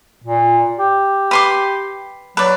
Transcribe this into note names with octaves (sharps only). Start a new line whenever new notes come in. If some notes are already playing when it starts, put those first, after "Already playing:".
A#2
G4
B4 C6 D6
F#3 B4 D5